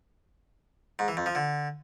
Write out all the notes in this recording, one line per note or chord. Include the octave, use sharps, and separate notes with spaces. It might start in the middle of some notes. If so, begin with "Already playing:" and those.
G#2
E3
F2
F3
D3